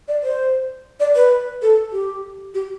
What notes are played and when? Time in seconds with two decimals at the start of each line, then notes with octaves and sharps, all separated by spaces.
0.08 D5
0.23 C5
1.00 D5
1.16 B4
1.62 A4
1.93 G4
2.54 G4